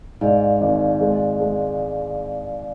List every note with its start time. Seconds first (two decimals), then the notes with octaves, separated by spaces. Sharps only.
0.21 G#2 D5 F5
0.61 G#1
1.01 G#3
1.40 G#3